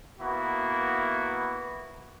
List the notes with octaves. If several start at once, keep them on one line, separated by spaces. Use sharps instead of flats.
A#3 B3 E4 F#4